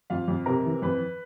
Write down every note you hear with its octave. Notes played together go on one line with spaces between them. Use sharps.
F2 F4 F5
F2
C3 A#4 A#5
E3
F2 B4 B5